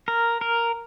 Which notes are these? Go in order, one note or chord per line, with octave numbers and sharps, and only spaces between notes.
A#4
A#4